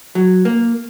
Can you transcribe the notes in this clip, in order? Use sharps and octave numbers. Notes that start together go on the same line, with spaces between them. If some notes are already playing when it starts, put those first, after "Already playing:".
F#3
A#3